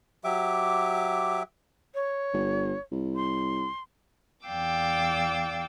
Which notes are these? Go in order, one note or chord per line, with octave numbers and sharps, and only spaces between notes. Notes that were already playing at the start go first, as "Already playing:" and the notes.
F#3 G4 E5 D6
C#5
G1
C2
C6
E2 D5 F5 G5 D6 E6